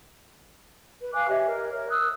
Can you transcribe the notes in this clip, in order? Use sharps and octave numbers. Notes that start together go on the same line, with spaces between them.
B4
F5 G#5 D6 F#6
G4 C#5 D#5 E5
A#4
A#4 C#5
D#6 E6 F#6